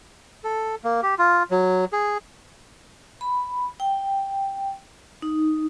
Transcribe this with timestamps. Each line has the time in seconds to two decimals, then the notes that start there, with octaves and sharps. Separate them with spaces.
0.44 A4
0.84 A#3
1.02 G4
1.18 F4
1.51 F#3
1.93 G#4
3.21 B5
3.80 G5
5.22 D#4